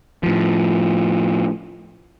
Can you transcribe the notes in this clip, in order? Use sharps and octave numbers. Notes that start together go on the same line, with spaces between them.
A2 F3